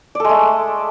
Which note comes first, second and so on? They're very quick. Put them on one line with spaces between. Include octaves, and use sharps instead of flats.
D5 A4 G#3 A3